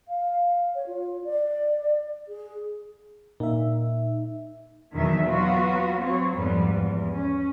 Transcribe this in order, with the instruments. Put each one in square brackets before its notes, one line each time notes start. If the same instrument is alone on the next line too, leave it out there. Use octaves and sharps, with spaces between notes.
[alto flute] F5
C#5
F4
D5
G#4
[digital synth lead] A#2 [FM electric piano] D#4 E5
[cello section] E2 B2 D#3 F#3 E5
F#3 B3 F4 F#4
F#3 C4 C#5
F2 G#2 F3 G3 B3
E2
C#4